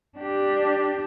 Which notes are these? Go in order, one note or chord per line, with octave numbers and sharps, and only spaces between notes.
D4 G4